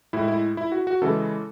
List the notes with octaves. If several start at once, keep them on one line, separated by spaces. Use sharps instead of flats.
A2 G#3 E4
E4
E4
F#4
F#4
C#3 E3 G#3 A4